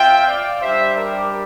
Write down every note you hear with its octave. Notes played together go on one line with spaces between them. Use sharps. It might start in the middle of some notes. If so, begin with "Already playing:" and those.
Already playing: C4 F4 E5 G5
D5 F5
G3 D4 G4 C5 E5
A#4 D5